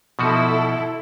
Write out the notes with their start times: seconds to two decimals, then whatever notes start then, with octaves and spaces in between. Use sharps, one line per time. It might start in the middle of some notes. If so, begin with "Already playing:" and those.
0.19 B2 F3 E4 F#4 A4